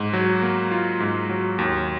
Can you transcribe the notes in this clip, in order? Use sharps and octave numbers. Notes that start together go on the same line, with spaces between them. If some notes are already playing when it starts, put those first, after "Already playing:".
Already playing: G#2
F#3
A#3
F4
G#2
F#3
D#2